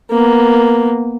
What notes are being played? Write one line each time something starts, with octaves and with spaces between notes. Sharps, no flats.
A#3 B3